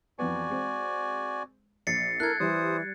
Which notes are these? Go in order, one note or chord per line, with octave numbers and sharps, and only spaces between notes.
F2 E3 B3 F#4 D5 G#5
G#3 C4
A#1 A6 C7 C#7
E4 A4 A#4 F#6 G#6
E3 G3 C5 D#6